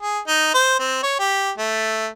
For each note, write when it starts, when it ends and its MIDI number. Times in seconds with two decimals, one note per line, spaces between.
0.02 0.20 68
0.27 0.51 63
0.54 0.79 72
0.79 1.02 60
1.03 1.17 73
1.19 1.51 67
1.58 2.08 57